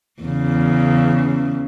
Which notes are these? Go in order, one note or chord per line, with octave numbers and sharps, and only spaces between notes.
E2 C#3